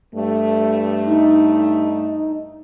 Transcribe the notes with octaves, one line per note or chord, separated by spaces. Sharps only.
G2 A3
D#4